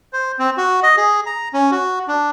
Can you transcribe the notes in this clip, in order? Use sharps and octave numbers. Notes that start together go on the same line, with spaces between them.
C5
C4
F#4
D#5
G#4
A#5
C#4
F#4
D4